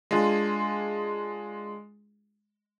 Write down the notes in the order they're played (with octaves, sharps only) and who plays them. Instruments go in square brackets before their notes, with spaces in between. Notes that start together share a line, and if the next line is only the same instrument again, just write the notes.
[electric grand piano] G#3 D4 F4 G#4